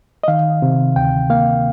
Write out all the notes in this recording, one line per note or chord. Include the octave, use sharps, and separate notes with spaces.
D#5
D#3 F5
C3
D2 G5
A#3 F5